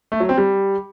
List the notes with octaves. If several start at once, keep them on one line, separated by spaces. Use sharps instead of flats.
A3
F#3
C4
G3